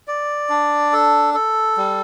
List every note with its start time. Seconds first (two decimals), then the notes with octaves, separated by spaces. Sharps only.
0.08 D5
0.49 D4
0.93 A4
1.34 A4
1.77 G3